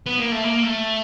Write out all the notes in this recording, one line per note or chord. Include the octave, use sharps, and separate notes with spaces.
B3
A#3
A3
A#3
A3